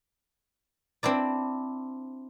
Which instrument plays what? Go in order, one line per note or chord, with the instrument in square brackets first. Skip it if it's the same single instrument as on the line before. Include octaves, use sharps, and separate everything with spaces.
[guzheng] C4 D4 E4 D5